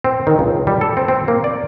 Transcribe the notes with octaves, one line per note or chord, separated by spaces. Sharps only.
C4
D#3
C#2
G3
A4
C4
C4
A#3
D5